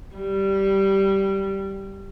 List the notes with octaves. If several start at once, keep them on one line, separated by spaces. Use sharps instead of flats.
G3